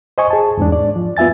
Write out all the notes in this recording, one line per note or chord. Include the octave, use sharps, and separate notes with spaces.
C5 D#5 G#5 C#6
G#4 A5
E2 G#2 D4
D5
F3
B3 F4 E5 G#5 A6